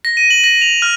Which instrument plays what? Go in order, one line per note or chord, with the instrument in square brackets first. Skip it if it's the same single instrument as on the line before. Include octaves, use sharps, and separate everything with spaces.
[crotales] A#6
D#7
F#7
A#6
F7
F6